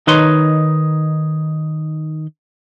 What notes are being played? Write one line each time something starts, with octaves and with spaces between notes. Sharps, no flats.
D#3 D#4 B4 C#5 C6